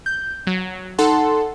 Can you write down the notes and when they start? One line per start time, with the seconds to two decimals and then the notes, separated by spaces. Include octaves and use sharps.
0.06 G6
0.47 F#3
0.98 D#4 A4 F#5 A5 C6